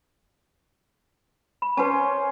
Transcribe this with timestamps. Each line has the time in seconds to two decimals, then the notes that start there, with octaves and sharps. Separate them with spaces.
1.62 B5
1.77 C#4 B4 C5 F#5 A5